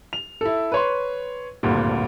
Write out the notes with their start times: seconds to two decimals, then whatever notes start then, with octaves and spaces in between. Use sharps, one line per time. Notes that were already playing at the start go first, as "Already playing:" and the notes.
0.13 F7
0.41 E4 A4
0.72 B4 C#5 C6
1.63 G#1 D2 G2 A#2